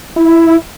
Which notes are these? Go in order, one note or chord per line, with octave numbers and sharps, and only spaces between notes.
E4